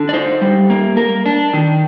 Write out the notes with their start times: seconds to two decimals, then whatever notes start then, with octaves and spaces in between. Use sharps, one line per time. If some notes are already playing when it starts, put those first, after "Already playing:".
Already playing: D3
0.09 D5
0.13 D#4 C5
0.41 G3
0.70 A#3
0.97 A#3 A#4
1.26 D4
1.53 D#3